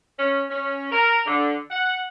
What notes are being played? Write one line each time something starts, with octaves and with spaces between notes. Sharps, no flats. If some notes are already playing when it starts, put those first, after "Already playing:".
C#4
C#4
A#4
D3
F#5